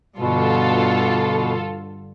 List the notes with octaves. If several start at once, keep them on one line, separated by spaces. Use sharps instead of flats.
G2 B2 D3 F4 A4